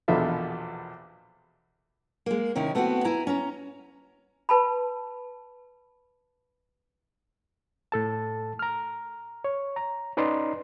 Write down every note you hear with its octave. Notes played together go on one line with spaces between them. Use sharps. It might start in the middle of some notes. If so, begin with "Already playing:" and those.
A#1 E2 B2 F3 A4 E5
G#3 A#3
C3 D#3 C#4 E4
A3 B3 C4 E4 F#4
E4 G#5 A#5
C#4 A#5
B4 A5 B5
A2 A4 A5
A#5 F6
C#5
A#5
C#4 D#4 B4 D5 A#5 C6